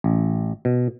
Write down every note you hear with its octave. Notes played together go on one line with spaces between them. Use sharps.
A1
B2